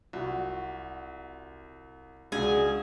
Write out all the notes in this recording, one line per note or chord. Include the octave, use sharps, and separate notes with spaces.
C2 F4 F#4
C#2 G#3 D4 F#4 G#4